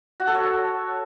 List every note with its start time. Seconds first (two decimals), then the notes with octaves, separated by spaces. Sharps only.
0.20 F#4
0.27 A4
0.35 C#5